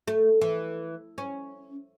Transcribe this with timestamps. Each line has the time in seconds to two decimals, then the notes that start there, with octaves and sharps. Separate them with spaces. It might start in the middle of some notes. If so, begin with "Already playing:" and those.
0.08 A3
0.41 E3
1.18 C#4